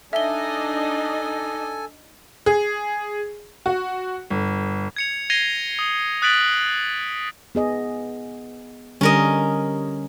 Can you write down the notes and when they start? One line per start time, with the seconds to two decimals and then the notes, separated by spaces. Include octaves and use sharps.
0.13 D4 D#4 A4 D#5 E5 G#5 G7
2.46 G#4
3.66 F#4
4.30 G1
4.96 G#6 C#7 F7
5.30 G#6 A#6 C7 D#7 F7 G7
5.79 D#6
6.22 D#6 F#6 A6 B6 D7 F#7
7.55 B3 G#4 D#5
9.01 D3 G3 C#4 A#4 D#5